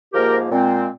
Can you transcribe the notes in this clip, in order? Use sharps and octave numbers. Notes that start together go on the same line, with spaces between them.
G#2 F3 A#3 G4 A#4
A#2 G#3 C4